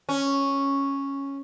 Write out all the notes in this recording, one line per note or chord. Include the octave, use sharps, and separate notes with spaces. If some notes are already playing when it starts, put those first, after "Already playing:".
C#4